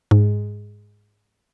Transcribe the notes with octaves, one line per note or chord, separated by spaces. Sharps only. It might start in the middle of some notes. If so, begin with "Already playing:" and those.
G#2